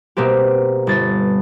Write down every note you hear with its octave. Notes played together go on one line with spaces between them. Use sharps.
B2 A#3 C4 G4
G1 A6